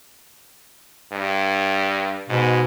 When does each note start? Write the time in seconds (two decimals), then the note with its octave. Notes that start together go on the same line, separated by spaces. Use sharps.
1.12 G2
2.30 G#2 B2